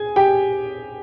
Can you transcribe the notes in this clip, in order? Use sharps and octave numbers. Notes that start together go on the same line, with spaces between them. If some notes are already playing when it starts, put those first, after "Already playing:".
Already playing: G#4 G#5
G4 G5